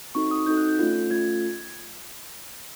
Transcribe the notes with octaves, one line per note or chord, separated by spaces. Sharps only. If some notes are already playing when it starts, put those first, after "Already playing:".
C4 D#4 F#4 A4 C#6
D#6
C4 D#4 F#4 A4 G6
F#6
G6
A3 C#4 F4 A4
A3 C#4 F4 A4 G#6